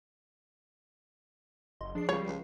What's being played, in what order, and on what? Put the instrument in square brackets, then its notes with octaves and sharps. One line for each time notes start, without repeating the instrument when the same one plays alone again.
[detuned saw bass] F#1 [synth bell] D#5 C6
[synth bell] F3 G#4 C7 [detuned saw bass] D4
[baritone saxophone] C#2 [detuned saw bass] G3 [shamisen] C#5
[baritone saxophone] C#2